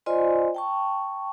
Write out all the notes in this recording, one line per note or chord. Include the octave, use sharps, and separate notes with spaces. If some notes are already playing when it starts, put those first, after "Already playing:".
F4 C5 D5 D#5 G#5 C6
G5 A5 C#6